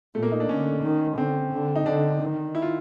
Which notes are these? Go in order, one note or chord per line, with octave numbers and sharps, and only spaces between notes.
A#2 A3
A#3
D#4
D4
D3 C#4
D#3
D3 C4
D3
D#4
D3 D4
D#3
E4
F4